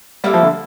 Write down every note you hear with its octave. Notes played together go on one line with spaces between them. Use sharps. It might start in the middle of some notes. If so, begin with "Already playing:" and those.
G3 A#3 E4 A4
F3
D3